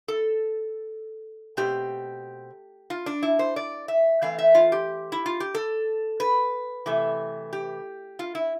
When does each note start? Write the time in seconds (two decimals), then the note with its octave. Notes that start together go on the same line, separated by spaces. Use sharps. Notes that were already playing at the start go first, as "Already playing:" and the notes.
0.08 A4
1.57 B2 A3 C4 G4
2.90 F4
3.06 D4
3.23 E4
3.39 C5
3.56 D5
3.88 E5
4.22 E3 A3 C4 F5
4.39 E5
4.55 F4
4.72 G4
5.12 E4
5.26 F4
5.40 G4
5.55 A4
6.20 B4
6.86 C3 E3 A3
7.53 G4
8.19 F4
8.35 E4